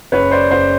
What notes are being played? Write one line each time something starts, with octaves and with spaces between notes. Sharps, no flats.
F#1 B4 C#5
C5 D5
F#1 C5 D5